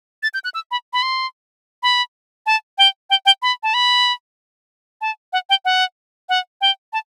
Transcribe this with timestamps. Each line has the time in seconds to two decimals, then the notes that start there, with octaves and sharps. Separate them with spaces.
0.23 A6
0.34 G6
0.44 F#6
0.54 E6
0.71 B5
0.93 B5
1.02 C6
1.83 B5
2.46 A5
2.78 G5
3.10 G5
3.26 G5
3.42 B5
3.63 A5
3.74 B5
5.01 A5
5.33 F#5
5.50 G5
5.65 F#5
6.29 F#5
6.61 G5
6.93 A5